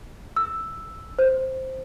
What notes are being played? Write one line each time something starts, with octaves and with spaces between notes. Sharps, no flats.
E6
C5